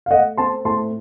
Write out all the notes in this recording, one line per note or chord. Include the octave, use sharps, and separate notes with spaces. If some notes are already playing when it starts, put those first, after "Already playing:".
F5
A3 D#5 F#5
C4 A5 C6
A2 A5 C6